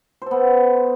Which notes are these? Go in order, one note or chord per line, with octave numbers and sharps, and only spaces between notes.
B3 A4 C5